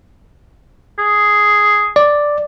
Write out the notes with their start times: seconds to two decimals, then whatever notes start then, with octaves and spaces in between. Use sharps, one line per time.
0.99 G#4
1.96 D5